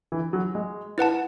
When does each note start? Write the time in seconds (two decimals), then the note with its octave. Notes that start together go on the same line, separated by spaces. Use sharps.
0.12 E3
0.33 F#3
0.55 G#3
0.98 E4 B4 F#5 A5